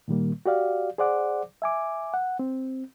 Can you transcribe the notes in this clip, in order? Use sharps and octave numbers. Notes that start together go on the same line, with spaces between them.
A#2 D#3 G3 A#3
F#4 G4 D5 F5
G#4 C5 D5 F#5 D6
E5 G#5 D6
F#5
C4